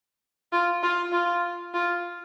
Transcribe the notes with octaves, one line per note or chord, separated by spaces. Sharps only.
F4
F4
F4
F4